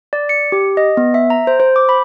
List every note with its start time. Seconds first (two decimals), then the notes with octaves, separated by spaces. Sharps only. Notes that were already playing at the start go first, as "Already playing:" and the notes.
0.13 D5
0.29 C#7
0.52 G4
0.77 D#5
0.97 B3
1.14 E5
1.30 A#5
1.47 C5
1.60 C5
1.76 D6
1.89 B5